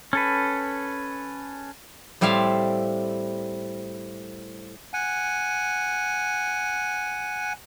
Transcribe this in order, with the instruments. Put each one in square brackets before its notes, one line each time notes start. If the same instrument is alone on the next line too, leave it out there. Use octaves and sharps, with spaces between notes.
[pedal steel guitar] C#4 A4 B4
[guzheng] A2 G3 C4 E5 F5
[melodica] F#5 G#5